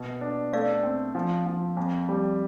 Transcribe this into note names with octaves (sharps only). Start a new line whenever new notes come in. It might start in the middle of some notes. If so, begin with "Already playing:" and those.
Already playing: B2
D4
A3 D5 F5
C4
F3
F3
F2
G3